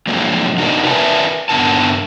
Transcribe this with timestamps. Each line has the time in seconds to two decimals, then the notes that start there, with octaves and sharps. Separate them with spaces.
0.07 D3 F3 F#3 G#3 A#3 D4
0.57 C3 D4 D#4 F#4 A#4
0.84 A#4 B4 D5 E5 G#5 A5
1.49 G2 D3 B3 A#4 A5